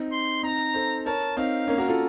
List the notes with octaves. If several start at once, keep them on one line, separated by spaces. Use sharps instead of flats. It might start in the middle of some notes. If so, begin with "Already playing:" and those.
Already playing: C4 D#4
C6
C4 D#4 A#5
A4 C5
A#4 C#5 A5
C4 D#4 F5
A#3 C#4
F#4 A#4
F4 A4